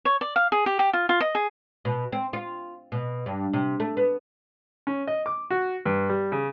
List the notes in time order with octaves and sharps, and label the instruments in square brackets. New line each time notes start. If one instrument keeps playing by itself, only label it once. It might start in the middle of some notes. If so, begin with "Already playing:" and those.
[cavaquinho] C#5
D5
F5
G#4
G4
G4
F4
F4
D#5
G#4
[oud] B2
C4
F4
B2
G2
C3
A3
B3
[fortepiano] C#4
D#5
D6
F#4
G2
G3
C#3